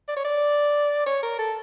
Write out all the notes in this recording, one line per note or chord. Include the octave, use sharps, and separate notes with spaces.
D5
C#5
D5
C#5
A#4
A4